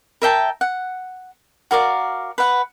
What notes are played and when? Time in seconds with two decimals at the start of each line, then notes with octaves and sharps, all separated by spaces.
0.22 A#4 E5 G5 A5
0.61 F#5
1.71 F#4 A#4 D5 F5
2.38 B4 F#5